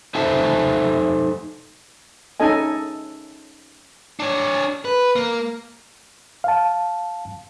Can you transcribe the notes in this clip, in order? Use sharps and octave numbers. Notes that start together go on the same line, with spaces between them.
D#4 A4 C5 E5 G#5 A5
C#4 D#4 A4 D#5 G#5
D4 C#5
B4
A#3
F5 A5